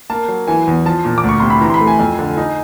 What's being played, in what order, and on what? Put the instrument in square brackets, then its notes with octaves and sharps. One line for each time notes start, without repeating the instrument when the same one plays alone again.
[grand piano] A#3 A5
F#3
E3 G#5
E2
F3 A5
A#2
D6
D2 C#6
C3 C6
B5
E3 A#5
C6
B5
A3
G#5
F2
D3
D#4